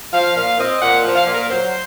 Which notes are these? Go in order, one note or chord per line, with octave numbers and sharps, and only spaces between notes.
F3 F5
A#2 F5
C4 D#5
A#2 F#5
F3
F5
A#2
A#4
F#3 C5